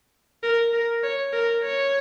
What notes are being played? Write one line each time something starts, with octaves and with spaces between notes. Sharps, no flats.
A#4
A#4
C#5
A#4
C#5